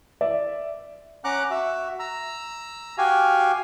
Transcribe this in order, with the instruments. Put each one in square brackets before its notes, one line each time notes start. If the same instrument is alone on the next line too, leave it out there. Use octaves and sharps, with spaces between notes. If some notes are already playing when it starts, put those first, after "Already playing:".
[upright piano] D5 E5
[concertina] C#4 F#5 A#5 D6 F#6
F#4 E5
A#5 E6
F#4 G4 F5 G#5